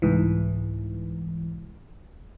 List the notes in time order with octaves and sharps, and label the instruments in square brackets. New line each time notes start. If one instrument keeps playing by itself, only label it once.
[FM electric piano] C2 G#2 E3